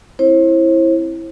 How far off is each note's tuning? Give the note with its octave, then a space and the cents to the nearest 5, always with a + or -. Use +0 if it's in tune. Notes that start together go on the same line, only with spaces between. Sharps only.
C4 +30 E4 +0 C5 +40